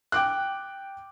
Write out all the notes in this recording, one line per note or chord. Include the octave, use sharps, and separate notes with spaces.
G5 D6 F#6